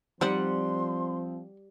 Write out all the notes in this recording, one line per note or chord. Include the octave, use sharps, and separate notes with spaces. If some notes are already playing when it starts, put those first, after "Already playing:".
F3 G3 C4 D#4 C5 D5 F#5 C6